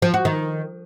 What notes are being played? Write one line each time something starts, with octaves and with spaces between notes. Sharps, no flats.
F3
F#4
D#3